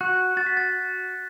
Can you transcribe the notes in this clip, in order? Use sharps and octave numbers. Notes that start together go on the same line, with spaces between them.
F#4 F#6
F#4 A6
B6
A6